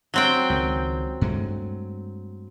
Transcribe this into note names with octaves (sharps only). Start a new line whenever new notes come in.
F#3 C4 G5
C#2 D#3
G2 G#3 A3